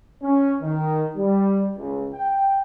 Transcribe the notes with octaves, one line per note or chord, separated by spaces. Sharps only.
C#4
D#3
G3
C#2
G5